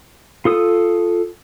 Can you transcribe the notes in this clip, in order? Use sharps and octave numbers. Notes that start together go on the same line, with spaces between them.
F4 A4 D#6